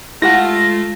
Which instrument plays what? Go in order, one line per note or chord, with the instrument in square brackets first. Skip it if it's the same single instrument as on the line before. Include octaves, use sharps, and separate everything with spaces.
[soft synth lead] G#3 [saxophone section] A3 F4 [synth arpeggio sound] E4 G4 F#5 [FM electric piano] A#6